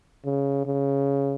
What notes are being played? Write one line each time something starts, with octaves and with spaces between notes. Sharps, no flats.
C#3
C#3